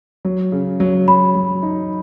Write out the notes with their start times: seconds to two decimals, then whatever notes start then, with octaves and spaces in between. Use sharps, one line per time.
0.25 F#3
0.52 C#3
0.80 F#3
1.08 F#3 B5
1.35 F#3
1.63 D#4